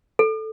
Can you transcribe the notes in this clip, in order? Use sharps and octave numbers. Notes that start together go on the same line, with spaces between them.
A4